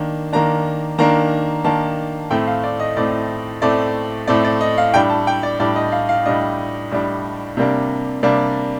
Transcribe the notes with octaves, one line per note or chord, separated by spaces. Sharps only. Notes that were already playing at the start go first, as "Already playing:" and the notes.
Already playing: D#3 A#3 D4
D#3 A#3 D4 A#5
D#3 A#3 D4 A#5
D#3 A#3 D4 A5
A2 A3 C4 G5
F5
D5
D#5
A2 A3 C4 D5
A2 A3 C4 D5
A2 A3 C4 D5
D5
D#5
F5
A2 G3 D4 G5
A5
G5
D5
A2 G3 D4 D5
D#5
F5
F5
A2 G3 D4 D#5
A2 G3 D4
C3 G3 A#3 D4
C3 G3 A#3 D4 D5